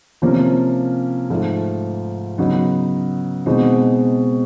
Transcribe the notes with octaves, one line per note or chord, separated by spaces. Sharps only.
C3 F3 A#3 C#4
G#2 F3 A3
C#3 F#3 B3 D#4
B2 G#3 C4 D#4